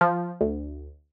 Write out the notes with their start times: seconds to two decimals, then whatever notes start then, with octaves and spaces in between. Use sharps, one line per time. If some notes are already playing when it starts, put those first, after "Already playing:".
0.01 F3
0.41 D2